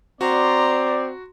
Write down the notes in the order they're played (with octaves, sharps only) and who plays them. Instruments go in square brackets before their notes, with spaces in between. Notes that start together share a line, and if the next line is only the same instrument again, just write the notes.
[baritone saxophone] C4 [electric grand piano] F#4 [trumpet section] D5 [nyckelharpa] A#5 C6